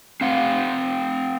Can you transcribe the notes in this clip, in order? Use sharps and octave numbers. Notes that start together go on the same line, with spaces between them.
C4 F5 F#5